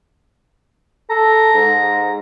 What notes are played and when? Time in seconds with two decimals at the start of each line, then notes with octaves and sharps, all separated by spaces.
1.10 A4 A#5
1.54 G#2